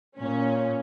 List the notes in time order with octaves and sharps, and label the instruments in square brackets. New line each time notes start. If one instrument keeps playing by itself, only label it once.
[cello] A#2 [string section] C#4